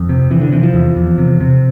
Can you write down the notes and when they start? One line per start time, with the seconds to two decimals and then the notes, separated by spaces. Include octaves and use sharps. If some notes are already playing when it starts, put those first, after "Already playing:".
Already playing: F2
0.09 C3
0.31 C3 E3
0.41 D3
0.52 C3 E3
0.63 F3
0.74 E2
0.96 E2
1.18 C3
1.41 C3